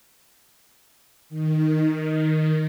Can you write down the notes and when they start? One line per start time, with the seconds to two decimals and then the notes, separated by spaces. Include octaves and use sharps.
1.29 D#3